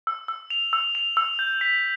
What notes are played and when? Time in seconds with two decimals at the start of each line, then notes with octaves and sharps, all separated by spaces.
0.07 E6
0.28 E6
0.50 F7
0.73 E6
0.95 F7
1.17 E6
1.39 G6
1.61 B6